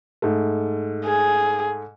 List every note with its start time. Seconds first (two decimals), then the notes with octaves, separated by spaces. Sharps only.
0.22 G#2 A3
1.05 G#4